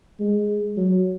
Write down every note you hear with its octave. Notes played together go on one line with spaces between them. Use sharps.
G#3
F#3